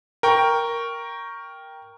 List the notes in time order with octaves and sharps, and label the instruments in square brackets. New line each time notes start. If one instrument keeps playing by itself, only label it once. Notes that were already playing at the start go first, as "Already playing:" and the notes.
[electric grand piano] A#4 G5 C#6